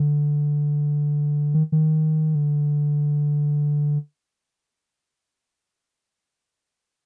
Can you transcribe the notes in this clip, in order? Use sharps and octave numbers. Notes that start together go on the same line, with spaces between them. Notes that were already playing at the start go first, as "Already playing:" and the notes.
Already playing: D3
D#3
D#3
D3